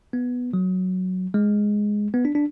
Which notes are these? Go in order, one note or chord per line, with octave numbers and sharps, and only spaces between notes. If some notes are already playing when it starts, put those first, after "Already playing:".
B3
F#3
G#3
B3
D4
D4